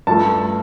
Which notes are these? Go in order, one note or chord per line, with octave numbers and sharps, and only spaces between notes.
G2 F3 A3 A5